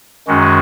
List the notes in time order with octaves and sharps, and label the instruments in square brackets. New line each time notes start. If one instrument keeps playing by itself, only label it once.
[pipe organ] F#2 D#3 G#3 C#4 F#4